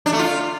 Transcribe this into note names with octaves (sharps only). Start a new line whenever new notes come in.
D4
A3
F4